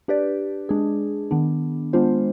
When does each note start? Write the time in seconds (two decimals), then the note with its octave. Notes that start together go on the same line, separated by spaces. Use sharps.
0.08 D4 G4 B4 D5
0.69 G#3 D4 G#4
1.31 D#3 B3 D4
1.93 G#3 B3 D4 F4 C5